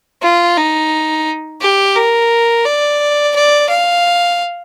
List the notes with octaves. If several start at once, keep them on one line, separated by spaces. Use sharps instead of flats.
F4
D#4
G4
A#4
D5
D5
F5